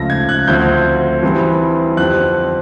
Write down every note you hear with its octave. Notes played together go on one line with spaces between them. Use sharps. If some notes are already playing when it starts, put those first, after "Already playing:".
Already playing: C#2 C#3 F3 A3 A#6
G#6
F#6
D2 D3 F3 A3 C4 G6
G2 E3 G3 C4
F2 D3 G3 C4 F#6